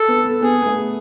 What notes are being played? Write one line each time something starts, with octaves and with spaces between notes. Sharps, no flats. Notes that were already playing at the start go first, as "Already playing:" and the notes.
Already playing: A4
B3
B3
B3 G#4
B3
A3